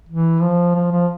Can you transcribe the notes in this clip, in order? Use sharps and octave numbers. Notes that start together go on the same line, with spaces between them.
E3
F3
F3
F3